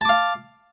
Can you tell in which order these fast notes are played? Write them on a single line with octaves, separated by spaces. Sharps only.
A5 D6 F5